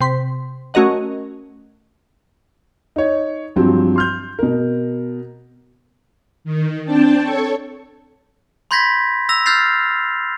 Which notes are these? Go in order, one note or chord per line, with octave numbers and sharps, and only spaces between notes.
C3 C6 B6
A3 C#4 F#4 A#4 D#5 F#5
D#4 C#5
G2 F3 F#3 C4 F4
C6 F6 G6
B2 A#4
D#3
C4 D4 G5 A5
A4 C#5 C#6
B5 C6 G6 G#6 A#6 B6
E6 A#6 F7
E6 F6 G6 A6 C7 F7